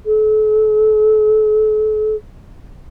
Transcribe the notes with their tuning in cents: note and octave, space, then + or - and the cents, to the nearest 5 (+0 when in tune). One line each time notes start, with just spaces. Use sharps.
A4 -40